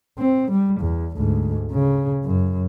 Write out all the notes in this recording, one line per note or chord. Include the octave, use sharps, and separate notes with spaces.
C4
G3
E2
D2 G#2
C#3
F#2